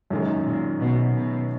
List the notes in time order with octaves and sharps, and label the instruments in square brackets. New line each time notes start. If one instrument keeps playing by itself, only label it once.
[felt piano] F#2 D#3 G#3 [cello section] A#2
[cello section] A#2
B2
B2